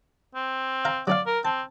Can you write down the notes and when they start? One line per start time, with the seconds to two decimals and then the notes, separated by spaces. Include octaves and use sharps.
0.35 C4
0.85 F5 A#5
1.07 F#3 C#4 D5 F5
1.26 A#4
1.45 C4 A5